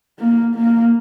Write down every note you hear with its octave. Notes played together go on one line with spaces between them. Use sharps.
A#3
A#3